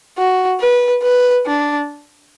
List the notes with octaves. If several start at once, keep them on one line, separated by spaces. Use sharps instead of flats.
F#4
B4
B4
D4